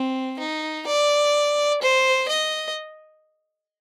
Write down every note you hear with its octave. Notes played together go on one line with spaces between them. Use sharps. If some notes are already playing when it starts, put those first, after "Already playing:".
Already playing: C4
D#4
D5
C5
D#5